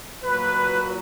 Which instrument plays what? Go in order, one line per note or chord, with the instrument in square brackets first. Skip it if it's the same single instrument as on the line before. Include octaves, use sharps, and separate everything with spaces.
[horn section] A#2 F#3 B4